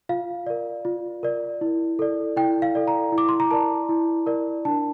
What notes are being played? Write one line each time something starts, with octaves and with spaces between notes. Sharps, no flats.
F4 F5
A#4 D5
F4
A#4 D5
E4
A4 D5
E4 G5
F5
A4 D5
A#5
E4
D6
C6
A#5
A#4 D5 A5
E4
A#4 D5
D4 A5